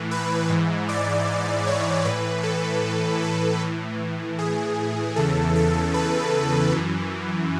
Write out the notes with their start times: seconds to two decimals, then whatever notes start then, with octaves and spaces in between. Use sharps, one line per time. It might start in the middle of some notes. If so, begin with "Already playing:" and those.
Already playing: A2 E3
0.11 B4
0.50 G#2 E3
0.89 D5
1.67 C#5
2.05 A2 E3 B4
2.43 A4
3.22 A4
3.60 A2 E3
4.39 G#4
5.16 E2 C#3 E3 A4
5.56 A4
5.94 B4
6.72 F#2 E3